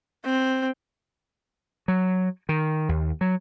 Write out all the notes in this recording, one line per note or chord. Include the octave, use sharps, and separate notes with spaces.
C4
F#3
D#3
D#2
F#3